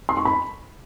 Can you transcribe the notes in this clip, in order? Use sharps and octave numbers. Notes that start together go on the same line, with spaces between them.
C6
C#6
B5